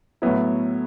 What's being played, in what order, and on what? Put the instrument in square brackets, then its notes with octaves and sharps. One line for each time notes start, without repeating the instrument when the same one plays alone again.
[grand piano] A2 F#3 B3 E4